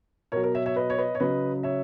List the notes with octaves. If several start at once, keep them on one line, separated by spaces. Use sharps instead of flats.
B2 F#3 A#4 C#5
A#4
C#5 E5
C#5 E5
B4 D#5
C#5
B4 D#5
C#5
C#3 F#3 B4 D#5
C#5 E5